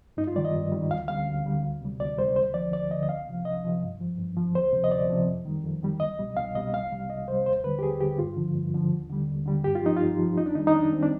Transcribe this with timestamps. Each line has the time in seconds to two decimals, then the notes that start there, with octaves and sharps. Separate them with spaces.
0.17 G2 D#4
0.27 F4
0.35 D#3 G3 D5
0.45 D#5
0.54 G2
0.72 D#3 G3
0.90 D2 F5
1.08 D3 G3 F5
1.27 D2
1.46 D3 G3
1.63 D2
1.81 C3 G3
2.00 D2 D5
2.18 G3 C5
2.22 C3
2.36 D2 C5
2.54 D3 F3 D5
2.72 D2 D5
2.91 F3 D#5
2.95 D3
3.03 D#5
3.09 C2 F5
3.28 C3 F3
3.45 C2 D#5
3.64 C3 F3
3.82 G2
4.01 F3
4.18 G2
4.36 F3
4.55 D2 C5
4.72 C3 F3
4.84 D#5
4.91 D2 D5
5.09 C3 F3
5.27 F2
5.45 D#3 G3
5.64 F2
5.82 D#3 G3
6.00 C2 D#5
6.19 B2 G3
6.37 C2 F5
6.55 B2 G3 D#5
6.73 C2 F5
6.92 C3 G3
7.09 C2 D#5
7.28 C3 C5
7.32 G3
7.46 D#2 C5
7.64 D3 G3 B4
7.79 G4
7.83 D#2 G#4
8.01 D3 G3 G4
8.19 G2 F4
8.37 D3 F3
8.55 G2
8.74 D3 F3
8.92 D#2
9.09 D3 G3
9.28 D#2
9.46 D3 G3
9.64 G2 G4
9.75 F4
9.83 F3 D#4
9.96 G2 F4
10.19 F3
10.37 F2 D#4
10.46 D4
10.55 D#3 G3 D#4
10.67 D#4
10.74 F2 D4
10.92 D#3 C4
10.96 G3
11.03 D4